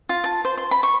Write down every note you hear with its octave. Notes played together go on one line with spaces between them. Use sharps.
F4
A5
C5
C6
B5
C#6